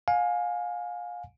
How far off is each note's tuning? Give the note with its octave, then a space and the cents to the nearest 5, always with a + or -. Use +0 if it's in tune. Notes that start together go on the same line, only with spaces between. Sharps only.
F5 +30 G#5 +0